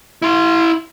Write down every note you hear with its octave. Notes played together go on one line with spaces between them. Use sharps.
E4 C6